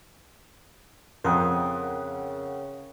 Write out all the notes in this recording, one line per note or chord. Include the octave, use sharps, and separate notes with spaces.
F2 C#3 A#4 F#5 G5 C6 D#6 F#6